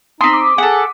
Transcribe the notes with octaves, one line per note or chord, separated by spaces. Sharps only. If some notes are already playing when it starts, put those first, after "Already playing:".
C4 D#4 C6 D#6 B6
D6
G#4 A4 F#5